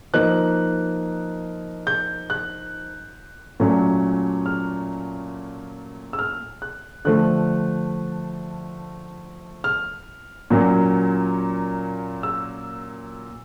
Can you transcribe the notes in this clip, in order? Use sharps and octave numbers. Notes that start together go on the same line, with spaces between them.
F3 A#3 D#4 F#6
G6
F#6
A#2 F#3 A3 C#4
F6
E6
F6
F#6
D3 F3 A3 F#6
F6
A#2 F#3 A#3 C#4
E6